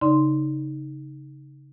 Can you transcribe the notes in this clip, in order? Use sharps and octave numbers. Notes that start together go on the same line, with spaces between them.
C#3 D#4 D5 C6